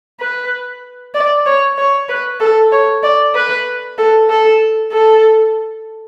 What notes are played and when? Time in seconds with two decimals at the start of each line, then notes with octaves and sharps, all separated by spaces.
0.20 B4
1.15 D5
1.46 C#5
1.78 C#5
2.09 B4
2.40 A4
2.72 C#5
3.03 D5
3.35 B4
3.98 A4
4.30 A4
4.92 A4